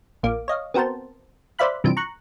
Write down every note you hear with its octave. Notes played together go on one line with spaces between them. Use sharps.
A#1 A#3 D6
C#5 D#5 F5
B3 C4 F#4 A#4 C5 A5
C5 D5 E5 F5 B5 F#6
G2 C3 E3 F3 D7
A#5 C#6 F#6